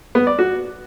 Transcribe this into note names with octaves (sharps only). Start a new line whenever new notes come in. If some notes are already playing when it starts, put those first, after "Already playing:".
B3
D5
F#4